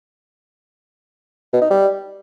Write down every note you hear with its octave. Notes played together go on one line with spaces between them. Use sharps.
B2
D#4
G3